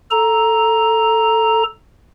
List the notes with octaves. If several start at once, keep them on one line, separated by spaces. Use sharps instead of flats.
A4 A#5